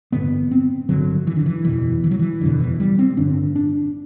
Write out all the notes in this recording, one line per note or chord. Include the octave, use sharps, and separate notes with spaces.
A1 G2 D3 B3
C4
A1 G2 D3 F#3
E3
D3
E3
F#1 E2 B2 E3
E3
F#3
E3
F#1 E2 B2 D3
E3
G3
C4
A1 G2 D3 D4
D4